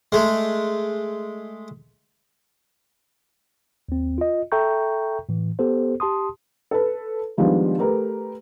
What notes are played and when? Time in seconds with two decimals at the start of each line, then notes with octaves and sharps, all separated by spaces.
0.12 G#3 A3
3.89 D#2 C4
4.18 F4 D#5
4.52 A4 E5 G5 A#5 C#6 G6
5.29 A2 E3
5.59 B3 G4 A4 C5
6.00 G4 A5 C6 D#6
6.71 A4 B4
7.37 D#3 F3 G3 G#3 B3 D4
7.78 A3 G4 A#4 B4